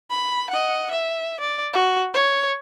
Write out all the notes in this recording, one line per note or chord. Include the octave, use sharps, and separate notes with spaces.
B5
D#5 F#5
E5
D5
F#4
C#5